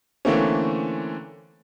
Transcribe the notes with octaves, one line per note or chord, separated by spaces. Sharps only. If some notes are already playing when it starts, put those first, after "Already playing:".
D3 E3 A3 A#3 C4 C#4